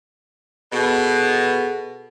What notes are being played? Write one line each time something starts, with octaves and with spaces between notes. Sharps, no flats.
B2 G#4 A4 F#5